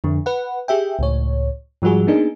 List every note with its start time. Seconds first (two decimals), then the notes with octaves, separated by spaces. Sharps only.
0.04 F2 D3
0.26 B4 F#5
0.68 G4 G#4 E5 G5
0.99 C#2 A2 C#5
1.82 G#2 F3 G3 F#4 G#4
2.07 A#3 B3 D4 D#4 G#4